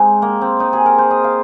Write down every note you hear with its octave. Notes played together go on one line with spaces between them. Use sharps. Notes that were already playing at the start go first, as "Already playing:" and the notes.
Already playing: G#3 C4 D#4
A#3
C4
D#4
G#4
A#4
C5
D#5
F5